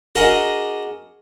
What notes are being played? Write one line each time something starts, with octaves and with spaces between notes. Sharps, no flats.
D4 F#4 G#4 A#4 D#5